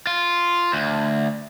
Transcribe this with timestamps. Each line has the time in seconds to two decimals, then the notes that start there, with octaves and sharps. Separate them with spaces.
0.07 F4
0.73 D2